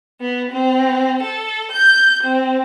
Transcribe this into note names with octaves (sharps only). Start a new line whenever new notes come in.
B3
C4
A4
G6
C4